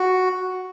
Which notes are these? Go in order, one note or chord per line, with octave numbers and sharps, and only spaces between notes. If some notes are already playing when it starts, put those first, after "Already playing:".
Already playing: F#4